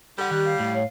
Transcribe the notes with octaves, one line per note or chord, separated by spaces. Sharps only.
G3 A4 F#5
D#3 G4 F#6
F5
A2
C#5